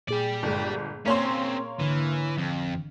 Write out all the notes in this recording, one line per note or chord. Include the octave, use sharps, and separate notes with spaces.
A#2 G4 G#4 D5
G1 G#3
A#3 C4 C#4 C#5 C6
G#1 D3 E3 F6
F2